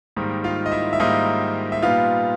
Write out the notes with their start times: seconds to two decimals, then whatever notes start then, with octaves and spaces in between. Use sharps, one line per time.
0.16 G#2 D#3 G3 A#3
0.44 F4 F5
0.66 D#5
0.72 E4 E5
0.93 E5
1.00 G#2 D#3 G3 A#3 D#4 D#5
1.72 E5
1.82 A#2 G3 B3 D#4 F4 F5